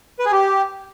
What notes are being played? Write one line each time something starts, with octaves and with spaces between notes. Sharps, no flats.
B4
G#4
G4